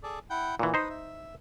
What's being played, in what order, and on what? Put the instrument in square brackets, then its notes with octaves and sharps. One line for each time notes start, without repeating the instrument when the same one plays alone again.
[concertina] G#4 A4 D5
E4 F#5 G5
[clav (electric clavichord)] A#2 E3 [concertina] F#4
[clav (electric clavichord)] D#4 C5 [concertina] B4 D#6
[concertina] E5